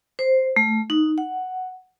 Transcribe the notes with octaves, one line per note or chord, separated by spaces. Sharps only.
C5
A3
D#4
F#5